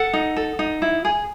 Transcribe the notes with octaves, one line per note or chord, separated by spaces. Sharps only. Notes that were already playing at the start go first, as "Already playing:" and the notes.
Already playing: A4 F#5
D#4
A4
D#4
E4
G#4